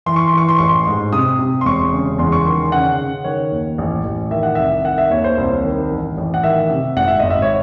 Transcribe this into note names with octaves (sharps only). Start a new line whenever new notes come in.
E3 C6
C#6
C6
E3 C#6
C6
A1 C#6
C6
G#2
C3 D#6
C3
C6
E1 C#6
C#3
E2 C6
C#6
D#3 C6
C#3 F#5
C#3
D#3 C#5
D#2
A1
A1
D#3 E5
F#5
C2 E5
D#3 F#5
E5
D#2 C#5
C5
C2 C#5
D#3
A1
A1
F#5
D#3 E5
C3
G#1 F#5
E5
G#1 D#5
E5
C#5